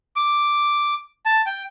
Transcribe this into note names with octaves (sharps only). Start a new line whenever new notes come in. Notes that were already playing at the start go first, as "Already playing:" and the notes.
D6
A5
G5